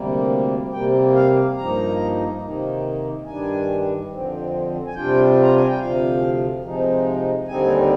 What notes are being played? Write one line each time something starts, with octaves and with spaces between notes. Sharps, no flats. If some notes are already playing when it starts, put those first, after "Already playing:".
Already playing: D2 C3 G3 A#3
C3 G3 A#3 G5
F5
G2 F3 A#3 D#4 A#5
C3 D#3 A#3 D#4
G2 D#3 G3 D4 G#5
F2 D3 F3 C4
G#5
C3 G3 D4 F4 G5
A#5
G#5
G5
D2 C3 F3 F5
C3 F3 G#3 D#4
D#2 D3 G3 C4 D#4 G#5